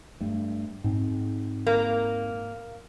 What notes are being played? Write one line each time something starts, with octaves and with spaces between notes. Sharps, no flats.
G2 A3
G#2 C4
A#3